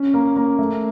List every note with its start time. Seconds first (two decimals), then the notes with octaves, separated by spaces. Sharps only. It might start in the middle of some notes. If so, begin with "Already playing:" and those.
Already playing: C#4
0.14 A#3
0.36 A#3
0.59 A3